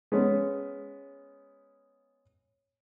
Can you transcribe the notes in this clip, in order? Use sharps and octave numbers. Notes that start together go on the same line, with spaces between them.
G#3 B3 C#4